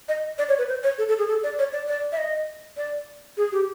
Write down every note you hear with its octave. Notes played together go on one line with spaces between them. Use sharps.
D#5
D5
C#5
B4
C5
C#5
A4
A4
G#4
A4
D5
C#5
D5
D5
E5
D#5
D5
G#4
G4